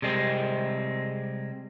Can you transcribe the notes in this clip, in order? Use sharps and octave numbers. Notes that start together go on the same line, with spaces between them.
C3 G3 G#3 C4